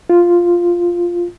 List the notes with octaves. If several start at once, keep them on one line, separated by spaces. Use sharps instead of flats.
F4